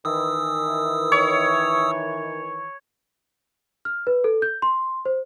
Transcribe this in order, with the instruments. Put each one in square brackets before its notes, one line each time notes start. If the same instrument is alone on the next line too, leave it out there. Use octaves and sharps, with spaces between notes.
[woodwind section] D#3 E3 [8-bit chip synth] D#6 E6
[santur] C#5
[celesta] F6
B4
A4
G6
C6
C5